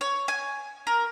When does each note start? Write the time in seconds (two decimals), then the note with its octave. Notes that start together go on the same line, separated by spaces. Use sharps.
0.01 C#5
0.28 G#5
0.87 A#4